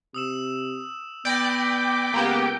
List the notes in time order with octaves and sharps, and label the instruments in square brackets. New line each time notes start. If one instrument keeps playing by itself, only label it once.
[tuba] C3 [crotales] D#6 E6 E7
[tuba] B3 [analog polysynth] D5 B5 [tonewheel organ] G5 [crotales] G6 A#6
[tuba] C#2 [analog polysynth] A#3 B3 G4